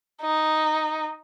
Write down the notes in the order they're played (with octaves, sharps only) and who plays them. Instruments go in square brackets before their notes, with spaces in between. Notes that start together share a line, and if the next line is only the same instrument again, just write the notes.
[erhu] D#4